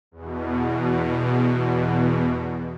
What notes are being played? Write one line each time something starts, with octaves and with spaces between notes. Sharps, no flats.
E2 B2